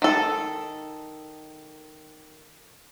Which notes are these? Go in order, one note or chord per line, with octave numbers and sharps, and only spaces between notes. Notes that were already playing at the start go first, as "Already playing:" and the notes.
D#3 A4